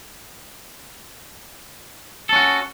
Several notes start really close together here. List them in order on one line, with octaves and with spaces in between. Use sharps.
A4 C#4 F#4